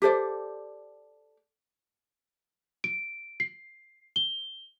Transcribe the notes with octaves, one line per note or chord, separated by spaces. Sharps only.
G4 A4 C5 D5
D7
C7
G7